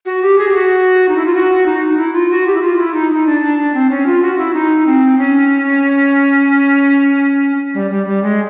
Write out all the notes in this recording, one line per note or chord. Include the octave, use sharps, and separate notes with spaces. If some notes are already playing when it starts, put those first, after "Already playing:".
F#4
G4
G#4
G4
F#4
D#4
E4
F4
F#4
D#4
D#4
E4
F4
F#4
G4
E4
F4
E4
D#4
D#4
D4
D4
D4
C4
C#4
F4
F#4
E4
D#4
C4
C#4
G3
G3
G3
G#3